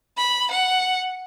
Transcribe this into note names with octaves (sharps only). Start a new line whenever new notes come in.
B5
F#5